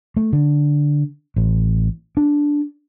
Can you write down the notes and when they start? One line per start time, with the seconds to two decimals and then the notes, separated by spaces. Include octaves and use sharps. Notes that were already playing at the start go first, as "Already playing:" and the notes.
0.17 A3
0.33 D3
1.36 A1
2.17 D4